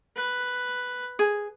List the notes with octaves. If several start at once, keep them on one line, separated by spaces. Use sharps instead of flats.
B4
G#4